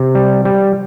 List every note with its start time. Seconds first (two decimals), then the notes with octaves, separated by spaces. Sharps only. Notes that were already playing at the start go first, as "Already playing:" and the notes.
Already playing: C3
0.15 G3
0.45 G3